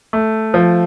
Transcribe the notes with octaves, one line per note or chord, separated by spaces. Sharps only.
A3
F3